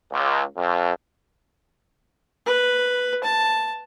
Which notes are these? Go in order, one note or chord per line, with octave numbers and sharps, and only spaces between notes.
C#2
F2
B4
A5